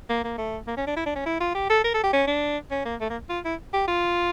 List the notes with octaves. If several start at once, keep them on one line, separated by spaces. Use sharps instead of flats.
A#3
A#3
A3
A#3
C#4
D4
E4
D4
C#4
E4
F4
G4
A4
A#4
A4
G4
C#4
D4
C#4
A#3
A3
A#3
F4
E4
G4
F4